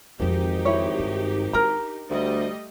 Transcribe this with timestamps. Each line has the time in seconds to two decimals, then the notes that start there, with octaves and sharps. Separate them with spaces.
0.20 G#1 F2 E3 D#4 G4
0.65 E4 C#5
0.98 G2
1.53 D4 A#4 A#5
2.10 D2 G3 A3 D#5